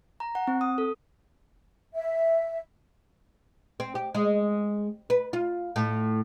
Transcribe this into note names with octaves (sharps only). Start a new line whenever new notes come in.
A#5
F#5
C4
D#6
A4
E5
C4
G4
G#3
B4
F4
A2